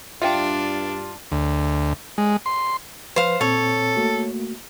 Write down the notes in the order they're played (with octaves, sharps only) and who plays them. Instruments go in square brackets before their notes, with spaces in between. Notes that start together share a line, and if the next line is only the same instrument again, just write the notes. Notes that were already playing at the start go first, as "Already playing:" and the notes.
[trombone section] G2 [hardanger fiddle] D4 [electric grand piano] F4 [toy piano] E5 G5
[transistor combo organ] D2
G#3
C6
[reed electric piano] F3 B4 [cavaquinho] C5 F5
[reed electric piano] A#2 C4 [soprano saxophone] A4 [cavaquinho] C#5
[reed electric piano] A3 A#3 F#4